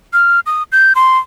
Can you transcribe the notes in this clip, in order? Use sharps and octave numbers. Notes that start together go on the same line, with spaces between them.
F6
D#6
G6
C6